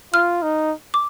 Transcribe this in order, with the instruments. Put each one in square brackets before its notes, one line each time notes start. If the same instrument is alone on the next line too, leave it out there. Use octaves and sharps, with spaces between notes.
[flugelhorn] F4 [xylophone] F6
[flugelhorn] D#4
[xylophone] D6